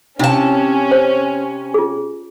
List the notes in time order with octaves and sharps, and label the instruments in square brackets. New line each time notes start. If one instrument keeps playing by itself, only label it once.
[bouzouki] C3 A5 [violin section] C#4 [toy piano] D4 E4 F5
[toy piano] C5
F4 G#4